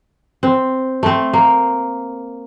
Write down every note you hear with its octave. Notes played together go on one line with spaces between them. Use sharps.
C4
A3 C4
A#3